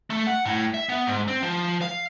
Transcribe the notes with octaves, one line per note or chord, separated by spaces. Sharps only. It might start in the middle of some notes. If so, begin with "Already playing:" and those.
A3
F#5
A2
E5
B3
G#2
C4
F3
F5